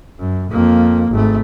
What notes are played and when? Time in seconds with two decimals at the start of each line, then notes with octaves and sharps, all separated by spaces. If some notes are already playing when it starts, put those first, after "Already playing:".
0.19 F#2
0.51 F2 A#3
1.11 G#1 A3